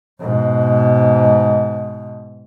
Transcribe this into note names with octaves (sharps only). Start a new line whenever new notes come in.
G#2 B2